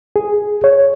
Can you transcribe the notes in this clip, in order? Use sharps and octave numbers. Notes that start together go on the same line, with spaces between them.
G#4
C#5